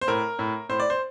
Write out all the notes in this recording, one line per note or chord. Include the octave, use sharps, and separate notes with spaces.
C5
A2 A#4
A2
A2 C5
D5
C5